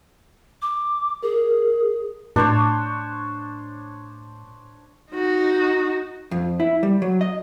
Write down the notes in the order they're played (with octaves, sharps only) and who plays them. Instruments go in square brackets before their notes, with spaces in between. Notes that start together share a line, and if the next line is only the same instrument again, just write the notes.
[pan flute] D6
[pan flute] G#4 [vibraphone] A#4
[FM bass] A2 [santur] D4 C5 C#5
[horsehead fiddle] D#4 F#4
[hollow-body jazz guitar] F2
E4
G3
F#3
D#5